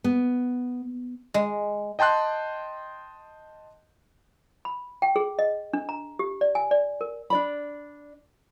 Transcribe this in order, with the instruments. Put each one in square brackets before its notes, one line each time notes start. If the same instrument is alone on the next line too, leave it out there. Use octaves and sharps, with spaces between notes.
[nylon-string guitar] B3
[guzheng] G#3
[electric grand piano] D#5 G5 A5 C6 F#6
[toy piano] B5
G5
G#4
D#5
D4
A#5
G4
D5
G#5
D5
A#4
[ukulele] D4 D5 B5